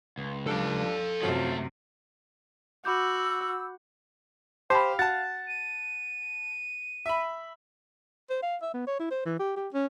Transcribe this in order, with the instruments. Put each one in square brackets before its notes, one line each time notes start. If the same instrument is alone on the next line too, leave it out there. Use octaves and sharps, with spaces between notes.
[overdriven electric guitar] C#2
[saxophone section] F3 G3 D4 [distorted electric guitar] A4 F5
[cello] F#2 C3 [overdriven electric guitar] D#3 A3 [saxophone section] F3 F#3
[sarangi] F#4 [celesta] B5 D6 G6 [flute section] E6
[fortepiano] G4 [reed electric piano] C5 [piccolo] F5 [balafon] A5 B5
[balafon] F#4 [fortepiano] F#5 A5 [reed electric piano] A6
[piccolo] D#7
[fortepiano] E5 B5
[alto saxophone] C5
F5
E5
B3
C#5
E4
C5
E3
G4
G4
C#4